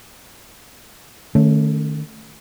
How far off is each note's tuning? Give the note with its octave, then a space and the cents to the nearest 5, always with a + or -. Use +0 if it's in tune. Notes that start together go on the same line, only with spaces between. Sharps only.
D#3 -35 A3 +0 C#4 +0